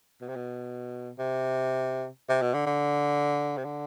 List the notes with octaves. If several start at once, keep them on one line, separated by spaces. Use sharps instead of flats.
B2
C3
B2
C3
C3
B2
D3
D3
C3
D3